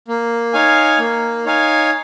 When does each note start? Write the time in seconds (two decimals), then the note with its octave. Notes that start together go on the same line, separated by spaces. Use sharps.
0.08 A#3
0.53 D#4 C#5 F5 G#5
0.99 A#3
1.45 D#4 C#5 F5 G#5